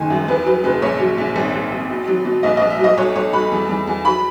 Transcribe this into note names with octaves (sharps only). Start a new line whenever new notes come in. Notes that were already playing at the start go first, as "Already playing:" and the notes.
Already playing: F#1 D#3 G#5
F#2
E2 B4
F#3 B4
F#1 B4
A#1 C#5
F#3
A#1
G#1
G#1
G#1
B2
F#3
B2
A#1 D#5
A#1 D#5
E5
F#3 D#5
B1 C#5
B1 C#5
B1 B5
E2
E2
E2
F#3 B5